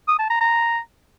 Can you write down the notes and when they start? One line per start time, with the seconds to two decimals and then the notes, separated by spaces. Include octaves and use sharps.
0.08 D#6
0.19 A5
0.30 A#5
0.41 A#5